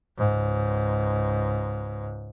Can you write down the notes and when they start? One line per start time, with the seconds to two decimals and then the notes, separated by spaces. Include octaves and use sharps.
0.18 C#2 G#2